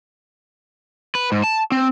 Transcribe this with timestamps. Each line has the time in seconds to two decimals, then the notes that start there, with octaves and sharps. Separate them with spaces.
1.15 B4
1.32 G#2
1.44 A5
1.72 C4